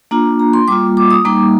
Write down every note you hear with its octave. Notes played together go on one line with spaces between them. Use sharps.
A#3 D4 F4 A#5
A#5
C6
G3 A#3 F4 D6
D6
D#6
G3 A#3 D#4 D6